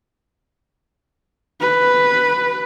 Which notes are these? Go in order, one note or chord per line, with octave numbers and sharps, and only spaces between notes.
B4